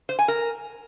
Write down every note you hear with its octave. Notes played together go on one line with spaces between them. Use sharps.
C5
G#5
A#4